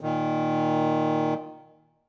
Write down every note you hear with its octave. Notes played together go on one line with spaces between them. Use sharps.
A#2 D#3